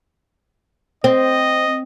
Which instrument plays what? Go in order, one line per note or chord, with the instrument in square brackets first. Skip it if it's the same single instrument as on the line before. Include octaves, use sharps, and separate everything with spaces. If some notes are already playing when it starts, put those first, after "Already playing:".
[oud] C4 [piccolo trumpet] D#5